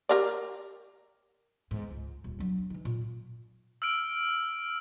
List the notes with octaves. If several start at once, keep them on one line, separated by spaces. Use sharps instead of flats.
G4 A#4 D5
E2 G#2
C#2
D#1
F#3 D4
E3 D#4
A#2
E6 F6 D7